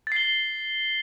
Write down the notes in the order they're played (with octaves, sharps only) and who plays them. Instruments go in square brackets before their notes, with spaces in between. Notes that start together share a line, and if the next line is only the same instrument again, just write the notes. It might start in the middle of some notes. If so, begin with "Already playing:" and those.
[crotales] A6
C7
G7